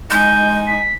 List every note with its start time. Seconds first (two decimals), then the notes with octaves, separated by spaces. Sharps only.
0.10 G#3 D#4 G#5 G6
0.67 B6